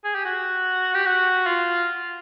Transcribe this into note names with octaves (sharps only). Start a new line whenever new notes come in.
G#4
G4
F#4
G4
F#4
F4